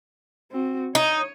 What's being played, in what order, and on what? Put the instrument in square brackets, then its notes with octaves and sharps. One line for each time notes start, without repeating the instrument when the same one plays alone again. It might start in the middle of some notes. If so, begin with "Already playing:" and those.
[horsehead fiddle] C4 F#4
[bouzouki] D#4 [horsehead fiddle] C#5